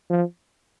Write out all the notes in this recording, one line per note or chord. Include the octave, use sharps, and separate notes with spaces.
F3